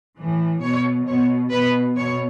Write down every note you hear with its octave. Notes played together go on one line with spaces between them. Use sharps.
A2 E3
B2 C#5
B2 C#5
B2 B4
B2 C#5